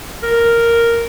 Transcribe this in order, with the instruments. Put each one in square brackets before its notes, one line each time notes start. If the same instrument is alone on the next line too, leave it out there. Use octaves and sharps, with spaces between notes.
[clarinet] A#4